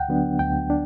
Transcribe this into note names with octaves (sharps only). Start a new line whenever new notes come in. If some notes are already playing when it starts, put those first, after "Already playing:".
Already playing: D2 F#5 G5
D3 F#3 B3 D4
D2 G5
D4